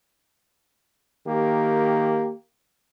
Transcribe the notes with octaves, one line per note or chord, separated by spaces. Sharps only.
D#3 A#3 G4